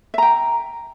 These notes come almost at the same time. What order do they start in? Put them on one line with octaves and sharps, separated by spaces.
E5 A#5 G5